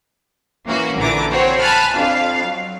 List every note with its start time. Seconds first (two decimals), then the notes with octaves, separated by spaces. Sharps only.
0.66 E3 A#3 C#4 F#4
0.97 A#1 D3 E3 A#5 D6
1.32 C4 F#4 C5 C#5
1.61 G#5 A5 B5 F6 F#6
1.95 F2 D4 F5
2.43 F#3